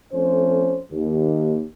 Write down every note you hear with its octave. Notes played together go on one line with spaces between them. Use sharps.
F2 A3 C#4 C5
D#2